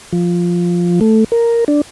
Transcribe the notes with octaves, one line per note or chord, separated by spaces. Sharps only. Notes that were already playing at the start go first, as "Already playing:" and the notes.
F3
A3
A#4
D4